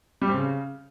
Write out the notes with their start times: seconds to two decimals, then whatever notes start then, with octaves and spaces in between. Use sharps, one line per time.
0.22 G3
0.28 C4
0.34 C#3